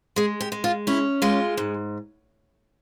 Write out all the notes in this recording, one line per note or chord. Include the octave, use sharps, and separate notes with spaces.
G#3 G#4
G4
G#3
F4
C#4 E4
G#3 F4
G#2